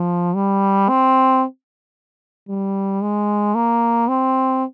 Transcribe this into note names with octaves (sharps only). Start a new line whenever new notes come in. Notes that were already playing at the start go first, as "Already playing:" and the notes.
Already playing: F3
G3
C4
G3
G#3
A#3
C4